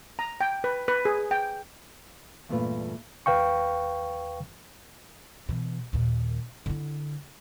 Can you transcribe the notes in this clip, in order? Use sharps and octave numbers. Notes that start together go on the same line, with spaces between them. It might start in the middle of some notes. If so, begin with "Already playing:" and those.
A#5
G5
B4
B4
G#4
G5
E2 G2 A#2 A3 F4 B4
D#2 B4 F5 G5 C#6
B2 E3
D#2 A#2
D3 E4